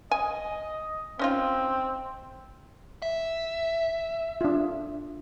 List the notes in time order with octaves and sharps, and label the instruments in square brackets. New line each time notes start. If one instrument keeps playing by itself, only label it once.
[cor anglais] D#5 [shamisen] G#5
[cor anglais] C4 [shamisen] C#4 D#4 F4
[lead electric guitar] E5
[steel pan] D4 F4